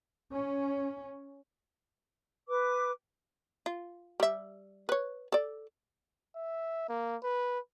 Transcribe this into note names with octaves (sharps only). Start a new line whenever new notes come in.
C#4
B4 D6
F4
G3 E5
B4 C#5
A4 D5
E5
A#3
B4